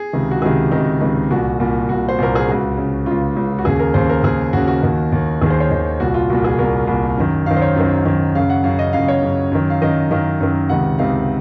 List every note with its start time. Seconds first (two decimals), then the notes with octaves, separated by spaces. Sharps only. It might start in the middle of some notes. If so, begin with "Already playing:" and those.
Already playing: G#4
0.13 C#2 C3 D#3
0.31 F#4
0.42 C#2 C3 D#3 G#4
0.71 C#2 C3 D#3 D#4
1.00 C#2 C3 D#3
1.30 C2 A#2 F#4
1.59 C2 A#2
1.89 C2 A#2 F#4
2.09 C5
2.18 C2 A#2 A#4
2.35 G#4
2.48 C#2 C#3 F#4
2.78 C#2 C#3
3.06 C#2 C#3 F4
3.36 C#2 C#3
3.59 F#4
3.64 D#2 C#3 G#4
3.79 A#4
3.94 D#2 C#3 C5
4.09 A#4
4.23 D#2 C#3 G#4
4.53 D#2 C#3 F#4
4.68 F#4
4.82 D#2 D#3
5.12 D#2 D#3
5.41 D#2 D#3 G#4
5.50 C5
5.60 C#5
5.70 D#2 D#3
6.00 C2 A#2 F#4
6.14 F4
6.30 C2 A#2 F#4
6.44 G#4
6.58 C2 A#2 A#4
6.87 C2 A#2
7.18 F#2 D#3
7.46 F#2 D#3 F5
7.57 C5
7.62 C#5
7.76 F#2 D#3
8.05 F#2 D#3
8.35 F#2 C#3 F5
8.50 F#5
8.64 F#2 F5
8.69 C#3
8.79 D#5
8.93 F#2 C#3 F5
9.08 C#5
9.23 F#2 C#3
9.52 F#2 D#3
9.70 F5
9.82 F#2 D#3 D#5
10.11 F#2 D#3 F5
10.40 F#2 D#3
10.69 C#2 C3 D#3 F#5
10.99 C#2 C3 D#3 F5